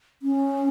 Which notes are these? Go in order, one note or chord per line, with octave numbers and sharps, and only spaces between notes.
C#4